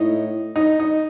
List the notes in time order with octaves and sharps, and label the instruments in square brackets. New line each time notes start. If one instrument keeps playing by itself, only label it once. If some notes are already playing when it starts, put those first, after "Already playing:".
Already playing: [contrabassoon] A2 [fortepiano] D#4
[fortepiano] D#4
D#4